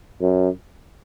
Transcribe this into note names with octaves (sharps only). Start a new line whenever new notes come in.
F#2